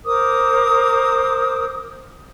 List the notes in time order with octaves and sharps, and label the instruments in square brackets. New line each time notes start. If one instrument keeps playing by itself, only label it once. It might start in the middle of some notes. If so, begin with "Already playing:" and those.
[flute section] A#4 C5 D6 D#6